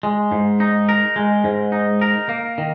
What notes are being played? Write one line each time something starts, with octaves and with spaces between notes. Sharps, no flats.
G#3
G#2
D#4
A#4
G#3
G#2
D#4
A#4
A#3
D#3